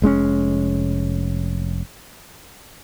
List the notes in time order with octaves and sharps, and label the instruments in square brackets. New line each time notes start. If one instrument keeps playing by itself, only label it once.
[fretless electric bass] F1 G#3 C4 C#4